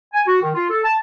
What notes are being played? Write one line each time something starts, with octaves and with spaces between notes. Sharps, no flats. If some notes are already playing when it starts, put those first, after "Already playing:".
G#5
F#4
D#3
F4
A4
A5